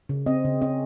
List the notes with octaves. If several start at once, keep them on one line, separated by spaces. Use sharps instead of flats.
C#3
C4 D#5
C#3
C#4 D#5